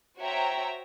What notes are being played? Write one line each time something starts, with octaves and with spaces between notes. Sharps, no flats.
F#4 C5 C#5 E5 G5 A#5